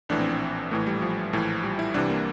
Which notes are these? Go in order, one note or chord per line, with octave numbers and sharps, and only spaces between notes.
A#1 A2 E3 D4
C4
C4
A#1 A2 E3 A3
G3
F3
A#1 A2 E3
G3
E4
C2 C3 E3 D4
A#3